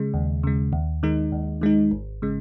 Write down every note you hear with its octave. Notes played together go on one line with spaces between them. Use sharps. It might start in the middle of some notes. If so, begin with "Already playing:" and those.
Already playing: C#3 G#3
D#2
C#3 G#3
D#2
D#3 G#3 D#4
D#2
D#3 G#3 D#4
G#1
C#3 G#3